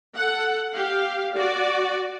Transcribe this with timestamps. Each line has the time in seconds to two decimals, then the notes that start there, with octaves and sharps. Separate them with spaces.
0.17 A4 F#5
0.75 G4 F5
1.34 F#4 D5